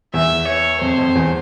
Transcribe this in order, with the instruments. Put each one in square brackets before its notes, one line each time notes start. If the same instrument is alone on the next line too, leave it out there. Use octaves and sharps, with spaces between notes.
[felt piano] E2 [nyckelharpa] E5
[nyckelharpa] C#5
[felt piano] F2 [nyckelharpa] C5
[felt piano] F2
E2